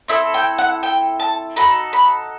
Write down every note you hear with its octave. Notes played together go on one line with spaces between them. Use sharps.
C4 E4 A4 E5
G5
F#5
G5
A5
D#4 F#4 A4 B5
B5